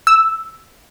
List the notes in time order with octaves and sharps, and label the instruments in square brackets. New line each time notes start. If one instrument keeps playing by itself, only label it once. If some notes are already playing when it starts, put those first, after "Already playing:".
[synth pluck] E6